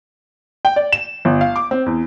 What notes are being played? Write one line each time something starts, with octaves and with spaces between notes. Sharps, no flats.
G5
D5
E7
G1
F5
D6
C4
E2